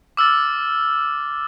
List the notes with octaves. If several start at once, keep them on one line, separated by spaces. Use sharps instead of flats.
D6 E6 F6 A6